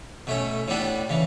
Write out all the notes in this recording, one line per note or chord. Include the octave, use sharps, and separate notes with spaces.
B2 A3 C#4
A2 G3 B3 D4
C#3 E3